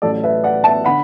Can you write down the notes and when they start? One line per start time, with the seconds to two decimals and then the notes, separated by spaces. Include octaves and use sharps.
0.02 A1 A2 F#3 A4 D5
0.24 B4 E5
0.44 D5 F#5
0.64 E5 A5
0.84 D3 F#5 B5